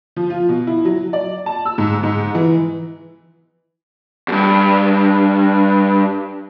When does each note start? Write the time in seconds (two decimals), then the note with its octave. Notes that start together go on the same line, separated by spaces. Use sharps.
0.16 F3
0.30 F4
0.49 B2
0.67 E4
0.85 F#3
1.13 D5
1.46 A5
1.65 E6
1.78 G#2
2.03 G#2
2.35 E3
4.28 E2 G2